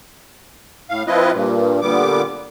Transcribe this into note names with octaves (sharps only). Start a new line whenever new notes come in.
A2 F5
F3 C4 E4 F4 B4 D#5
G2 A#2
A#2 D3 G3 B3 D6